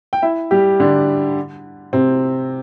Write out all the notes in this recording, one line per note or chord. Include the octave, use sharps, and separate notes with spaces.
G5
E4 E5
G3 G4
D3 D4
C3 C4